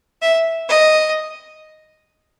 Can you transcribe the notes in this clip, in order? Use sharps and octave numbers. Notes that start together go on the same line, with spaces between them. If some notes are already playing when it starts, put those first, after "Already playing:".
E5
D#5